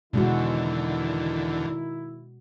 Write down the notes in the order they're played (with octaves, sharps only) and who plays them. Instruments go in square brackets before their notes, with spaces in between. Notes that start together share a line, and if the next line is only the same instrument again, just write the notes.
[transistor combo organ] E2 D3 [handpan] B2 G#3 F#4 [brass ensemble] D#3 E4